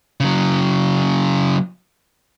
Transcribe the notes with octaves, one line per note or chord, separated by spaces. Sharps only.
C#3 F#3